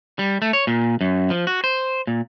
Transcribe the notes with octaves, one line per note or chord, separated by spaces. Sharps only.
G3
A3
C#5
A#2
F#2
F3
F#4
C5
A#2